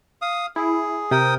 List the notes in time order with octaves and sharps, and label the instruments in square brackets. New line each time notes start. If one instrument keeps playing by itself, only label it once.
[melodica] F5 D#6
[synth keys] E4 [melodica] G#4
[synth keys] C3 [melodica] A#4 G5 D#6